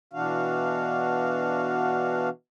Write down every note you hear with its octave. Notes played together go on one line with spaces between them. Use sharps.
B2 E3 D4 F#4 F5